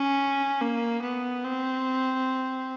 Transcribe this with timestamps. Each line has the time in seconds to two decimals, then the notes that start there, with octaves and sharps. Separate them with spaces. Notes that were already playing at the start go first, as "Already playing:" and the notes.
Already playing: C#4
0.61 A#3
1.02 B3
1.44 C4